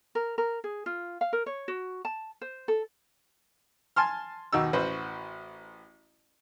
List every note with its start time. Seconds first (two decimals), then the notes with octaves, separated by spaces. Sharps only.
0.15 A#4
0.38 A#4
0.64 G#4
0.86 F4
1.21 F5
1.33 A#4
1.46 C#5
1.68 F#4
2.05 A5
2.41 C5
2.68 A4
3.96 G#5 A5 C6 F6
4.53 D#2 B2 D#4 E6
4.73 A1 F#4 B4 C5